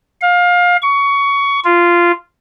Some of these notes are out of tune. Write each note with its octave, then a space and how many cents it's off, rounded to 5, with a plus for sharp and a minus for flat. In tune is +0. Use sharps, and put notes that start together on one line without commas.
F5 +25
C#6 +20
F4 -10